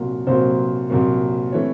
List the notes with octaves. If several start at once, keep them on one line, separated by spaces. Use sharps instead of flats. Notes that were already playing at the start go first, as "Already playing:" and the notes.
Already playing: C2 A#2 F#3 A#3
C2 A#2 F#3 A#3 C5
C2 A#2 F#3 A#3
C3 E3 A3 C#5